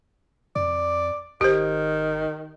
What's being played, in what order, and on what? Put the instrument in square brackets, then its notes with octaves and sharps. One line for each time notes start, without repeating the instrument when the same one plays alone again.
[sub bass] F2 [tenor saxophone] D5
[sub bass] G#1 [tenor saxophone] D#3 [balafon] G4 C5